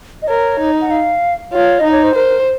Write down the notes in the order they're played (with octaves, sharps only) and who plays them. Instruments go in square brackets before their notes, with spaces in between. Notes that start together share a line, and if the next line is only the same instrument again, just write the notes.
[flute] D#5
[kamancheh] A#4 [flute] C#5
[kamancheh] D#4
[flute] F#5
F5
[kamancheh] F4 [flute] C#5
[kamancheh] D#4 [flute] D#5
[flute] C#5
C5
[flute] A#4 [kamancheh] C5